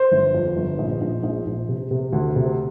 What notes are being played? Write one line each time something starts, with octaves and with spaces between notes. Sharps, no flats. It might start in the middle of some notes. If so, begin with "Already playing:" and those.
Already playing: C5
G1
F2
G1
A#1
A#1
A#1
A#1
C3
C3
D2
C3